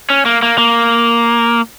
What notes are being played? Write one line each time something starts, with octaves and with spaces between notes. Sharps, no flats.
C#4
A#3
A#3
A#3